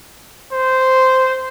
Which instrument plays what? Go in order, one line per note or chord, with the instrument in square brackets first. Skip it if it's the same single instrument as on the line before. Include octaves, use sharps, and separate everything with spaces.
[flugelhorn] C5